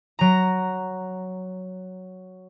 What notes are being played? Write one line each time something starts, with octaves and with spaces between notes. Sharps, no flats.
F#3 A#5